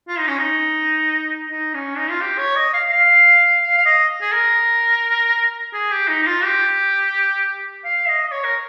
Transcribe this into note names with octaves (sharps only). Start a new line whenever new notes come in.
F4
D#4
C#4
D#4
D#4
C#4
D#4
F4
G4
C#5
D#5
F5
F5
F5
F5
D#5
G#4
A#4
G#4
G4
D#4
D#4
F4
G4
F5
D#5
D#5
C#5
A#4